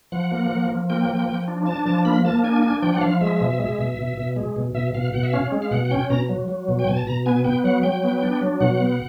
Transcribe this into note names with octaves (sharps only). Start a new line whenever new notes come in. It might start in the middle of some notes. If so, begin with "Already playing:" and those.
F3 F#5
A#3
F3
F3
A#3 G5
F3
F3
D4
D4 A5
F3 A5
A#3 B5
A#3 A5
D4 G#5
D4 G#5
F3 G5
F#5
F3 F5
G#3 E5
B2
G#3
B2
B2
B2
G#3
B2
B2 E5
B2 F5
B2 F#5
E5
C#4 F5
G#3
F5
B2 F#5
F#5
C#4 G5
B2 A#5
F#3
F#3
B2
G5
B2 G#5
A5
B2 A#5
B3 G#5
B3 G5
F#3 F#5
F#3 G5
B3
D4
F#3
B2 F#5
B3